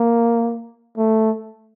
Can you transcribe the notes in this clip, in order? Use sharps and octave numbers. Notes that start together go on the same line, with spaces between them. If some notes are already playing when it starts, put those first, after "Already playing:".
Already playing: A#3
A3